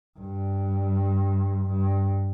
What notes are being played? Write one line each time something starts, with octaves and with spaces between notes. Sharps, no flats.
G2
G2